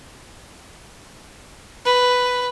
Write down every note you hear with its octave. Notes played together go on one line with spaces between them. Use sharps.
B4